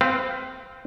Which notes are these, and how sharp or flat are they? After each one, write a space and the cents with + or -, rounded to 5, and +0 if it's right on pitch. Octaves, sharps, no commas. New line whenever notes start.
C4 -10 B4 +30 F5 +0